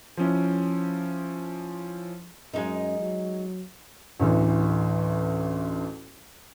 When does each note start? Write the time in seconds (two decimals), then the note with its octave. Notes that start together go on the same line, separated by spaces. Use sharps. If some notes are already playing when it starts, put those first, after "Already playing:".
0.17 F3 C#4 E4
2.53 F#2 G#3 D#4
2.99 F#3
4.20 A1 D2 E3